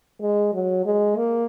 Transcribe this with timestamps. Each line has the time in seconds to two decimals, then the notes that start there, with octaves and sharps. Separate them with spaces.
0.21 G#3
0.54 F#3
0.86 G#3
1.17 A#3